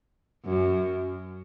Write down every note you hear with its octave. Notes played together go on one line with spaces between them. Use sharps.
F#2